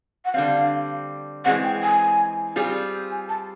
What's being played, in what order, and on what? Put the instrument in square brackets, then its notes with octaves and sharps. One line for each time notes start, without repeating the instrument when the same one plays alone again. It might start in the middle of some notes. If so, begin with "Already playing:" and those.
[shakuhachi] F#5
[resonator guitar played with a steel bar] D3 G3 C4 [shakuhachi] F5
[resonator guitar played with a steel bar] E3 G#3 C4 [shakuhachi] F#5
[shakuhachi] G5
G#5
[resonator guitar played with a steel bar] G3 C4 F4 G#4
[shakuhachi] G#5
A5